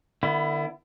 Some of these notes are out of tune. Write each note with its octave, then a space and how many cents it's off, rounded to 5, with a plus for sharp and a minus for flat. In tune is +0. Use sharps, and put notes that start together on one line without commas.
D3 +45 B3 +0 E4 +25